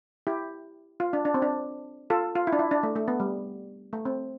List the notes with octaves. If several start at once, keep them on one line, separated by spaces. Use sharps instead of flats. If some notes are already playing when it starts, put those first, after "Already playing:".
E4 G4
F4
D4
D4
C4
D4
F4 A4
F4
E4
D4
E4
D4
A3
A3
B3
G3
A3
C4